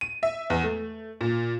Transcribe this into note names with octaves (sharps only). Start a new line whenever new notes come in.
D#7
E5
E2
A3
A#2